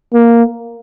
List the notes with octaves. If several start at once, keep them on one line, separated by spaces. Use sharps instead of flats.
A#3